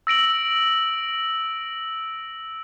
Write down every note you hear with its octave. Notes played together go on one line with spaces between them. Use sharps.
E6 A#6 D7 F#7